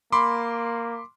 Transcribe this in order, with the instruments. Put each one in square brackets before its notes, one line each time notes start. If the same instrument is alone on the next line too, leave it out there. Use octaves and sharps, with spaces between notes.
[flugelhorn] A#3 [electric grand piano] B5 C6 D6